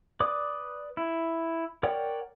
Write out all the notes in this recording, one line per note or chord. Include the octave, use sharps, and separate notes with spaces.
B4 D5 D6 D#6
E4
A#4 C#5 D5 F#5 G5